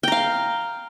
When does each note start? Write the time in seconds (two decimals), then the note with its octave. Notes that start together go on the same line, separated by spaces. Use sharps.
0.03 G5
0.08 A#5
0.12 F5